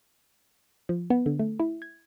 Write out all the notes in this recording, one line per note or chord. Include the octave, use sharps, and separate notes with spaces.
F3
B3
D3
A3
E4
G#6